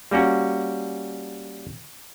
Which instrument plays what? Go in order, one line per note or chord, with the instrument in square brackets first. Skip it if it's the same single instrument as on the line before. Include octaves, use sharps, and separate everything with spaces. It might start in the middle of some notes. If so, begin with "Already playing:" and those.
[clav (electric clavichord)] G3 A#3 C#4 F#4